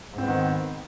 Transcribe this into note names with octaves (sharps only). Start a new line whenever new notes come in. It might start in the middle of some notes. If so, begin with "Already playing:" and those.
G#2 D#3 B3 C4